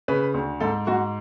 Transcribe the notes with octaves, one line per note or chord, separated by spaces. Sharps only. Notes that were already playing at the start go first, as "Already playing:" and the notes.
C#3 B4
D2
G#2 A4
G#2 F#4